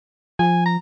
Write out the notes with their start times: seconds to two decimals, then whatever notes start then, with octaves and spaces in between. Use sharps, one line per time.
0.39 F3 G#5
0.65 A#5